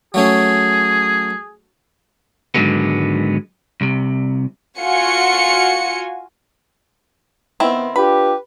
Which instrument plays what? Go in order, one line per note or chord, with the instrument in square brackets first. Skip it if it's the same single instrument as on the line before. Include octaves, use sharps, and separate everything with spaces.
[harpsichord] F#3 A3 C#4 [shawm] G#4
[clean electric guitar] G#2 D3 D#3 F#3 G#3 B3
C2 C3
[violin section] F4 F#4 G#5 C#7
[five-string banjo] D#3 C4 E4 [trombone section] B3
[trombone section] D4 F4 G4 [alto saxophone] B4 [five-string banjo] B5